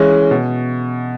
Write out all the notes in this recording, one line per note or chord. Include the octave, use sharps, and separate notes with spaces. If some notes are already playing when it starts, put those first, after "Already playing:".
Already playing: E3 G#3 C#4
B2